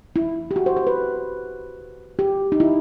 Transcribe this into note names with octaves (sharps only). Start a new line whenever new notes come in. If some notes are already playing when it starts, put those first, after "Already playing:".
E4
G4
F#4
C5
C5
B4
G4
D#4
E4